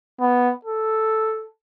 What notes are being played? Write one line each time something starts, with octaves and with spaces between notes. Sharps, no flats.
B3
A4